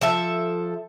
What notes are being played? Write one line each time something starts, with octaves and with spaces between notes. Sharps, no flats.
F3 A4 E5